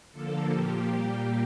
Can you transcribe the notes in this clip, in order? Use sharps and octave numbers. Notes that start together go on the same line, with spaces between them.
D3 F3 A#3 A4
A#2 F3 A#3 G4
A#2 G3 A#3